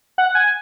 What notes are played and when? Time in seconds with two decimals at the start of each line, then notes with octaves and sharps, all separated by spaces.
0.18 F#5
0.35 G#5